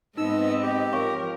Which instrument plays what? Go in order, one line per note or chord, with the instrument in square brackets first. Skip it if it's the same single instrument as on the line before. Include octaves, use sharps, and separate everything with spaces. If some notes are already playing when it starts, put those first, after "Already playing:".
[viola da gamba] G#2 C4 [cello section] B3 D#5 [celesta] D#4 [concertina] E6
[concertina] G4
[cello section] F3 A#4 [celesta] C#5 F5 C#6